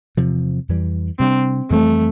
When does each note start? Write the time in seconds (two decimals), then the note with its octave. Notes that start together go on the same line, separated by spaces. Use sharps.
0.17 E2 C3 F3
0.69 F2 E3 G3
1.19 C3 G3 C4 D4
1.70 F2 E3 G3 A3 C4